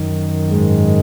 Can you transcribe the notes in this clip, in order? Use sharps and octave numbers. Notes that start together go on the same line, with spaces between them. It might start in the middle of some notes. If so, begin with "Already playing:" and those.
Already playing: F#2 D#3
G#2 G#3